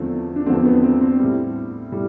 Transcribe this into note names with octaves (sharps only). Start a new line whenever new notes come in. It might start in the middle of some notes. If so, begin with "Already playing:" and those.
Already playing: E2 D3 F3 A3 C4
D4
E2 D3 F3 A3 C4
B3
C4
C4
A2 G3
A2 G3